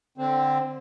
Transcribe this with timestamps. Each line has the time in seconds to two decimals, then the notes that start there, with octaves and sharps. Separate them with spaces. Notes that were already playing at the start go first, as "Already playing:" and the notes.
0.18 D3 C4